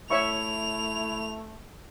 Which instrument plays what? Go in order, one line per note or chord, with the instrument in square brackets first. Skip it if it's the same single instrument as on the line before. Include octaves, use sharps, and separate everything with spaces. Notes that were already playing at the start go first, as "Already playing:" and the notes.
[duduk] A3 [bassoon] E4 [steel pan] C#5 E5 C#6 [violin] F7